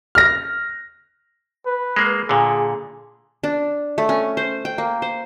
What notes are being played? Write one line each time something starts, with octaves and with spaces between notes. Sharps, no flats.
F6 A#6
B4
G#3 A#3
A#2 D3 G#4
D4
A3
C#4
C5
G5
A#3
C5